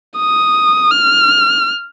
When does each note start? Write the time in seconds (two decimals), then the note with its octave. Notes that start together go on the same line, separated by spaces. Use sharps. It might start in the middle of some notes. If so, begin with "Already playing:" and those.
0.17 D#6
0.91 F6